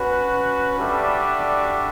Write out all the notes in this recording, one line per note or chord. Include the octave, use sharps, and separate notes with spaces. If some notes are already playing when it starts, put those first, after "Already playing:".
Already playing: C#4 F#4 B4
G3 D4 F#4 A4 E5